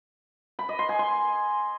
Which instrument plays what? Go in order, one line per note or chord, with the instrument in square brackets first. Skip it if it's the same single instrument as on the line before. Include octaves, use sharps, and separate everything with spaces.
[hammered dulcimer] B5
D#5
C6
G#5
C6